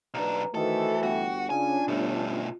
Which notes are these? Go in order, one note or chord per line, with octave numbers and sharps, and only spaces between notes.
B1 D4 B4 A#5
D#3 E3 A3 F#4 A4 B4 C5
G1 F#4 G5
C#3 C#4 D4 F4 G#5
G1 B2 A3